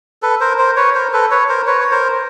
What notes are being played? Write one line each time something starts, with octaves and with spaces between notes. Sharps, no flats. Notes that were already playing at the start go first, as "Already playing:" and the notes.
A4 B4
A#4 C5
A#4 C5
B4 C#5
A#4 C5
A4 B4
B4 C#5
A#4 C5
B4 C#5
C#5
A#4 C5